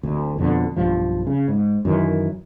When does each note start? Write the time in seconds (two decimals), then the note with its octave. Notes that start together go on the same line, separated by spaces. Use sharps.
0.03 D1 D2
0.38 F2 B2 D3
0.76 B1 G2 F3
1.27 C#3
1.48 G#2
1.85 F#2 D#3 E3